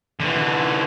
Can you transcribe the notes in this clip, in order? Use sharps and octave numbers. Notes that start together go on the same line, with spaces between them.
D3 E3